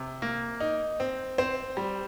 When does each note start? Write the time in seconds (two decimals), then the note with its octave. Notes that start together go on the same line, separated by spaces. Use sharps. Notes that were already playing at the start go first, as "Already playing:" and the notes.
Already playing: C3
0.22 A#3
0.60 D#4
1.00 C4
1.38 C4 C5
1.77 G3